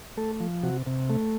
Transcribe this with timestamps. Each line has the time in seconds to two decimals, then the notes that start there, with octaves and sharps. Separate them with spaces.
0.17 A3 A4
0.40 F3
0.63 C3 F#4
0.86 C3
1.10 A3